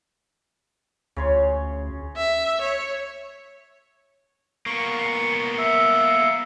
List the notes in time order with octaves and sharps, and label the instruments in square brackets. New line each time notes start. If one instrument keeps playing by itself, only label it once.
[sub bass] D2 [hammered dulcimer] C#3 C#5 C6
[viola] E5
C#5
[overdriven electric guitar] A#3 B3 [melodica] C#6
[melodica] E5